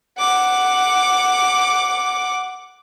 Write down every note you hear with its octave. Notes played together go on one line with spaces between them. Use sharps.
F#5 D6